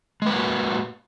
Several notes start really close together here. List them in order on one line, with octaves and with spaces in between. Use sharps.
G#3 B4 A#3 F#4